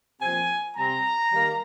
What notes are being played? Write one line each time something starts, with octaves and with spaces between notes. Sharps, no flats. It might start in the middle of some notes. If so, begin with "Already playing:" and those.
A#2 F3 C4 G#5
C3 G3 C4 A#5
D#3 G3 A#3